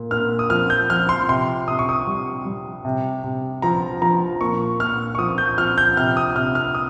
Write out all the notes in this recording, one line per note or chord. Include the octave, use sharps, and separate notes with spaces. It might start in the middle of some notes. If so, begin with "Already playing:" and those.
Already playing: A#2
A#2 F6
D#6
F3 F6
G6
F3 F6
C6
C3 C6
C3 D#6
C#6
D#6
G3
G3
C3
C3
F3 A#5
F3 A#5
A#2 C#6
A#2 F6
C#6
F3 D#6
G6
F3 F6
G6
C3 F6
D#6
C3 F6
F6
D#6